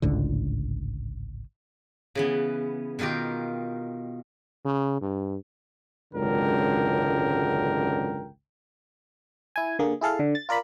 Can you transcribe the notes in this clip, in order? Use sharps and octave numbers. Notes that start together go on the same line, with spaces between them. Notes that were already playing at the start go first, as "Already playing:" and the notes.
G#1 C#2 A2 D3
C#3 E3 B3
B2 D#3 F4 G4 A#4
C#3
G2
G#1 C#2 F#2 D3 A#4 G5
E4 G#5
D3 A#3 G#4
E4 G#4 A4 F5
D3
A6
F4 A#4 D5 B5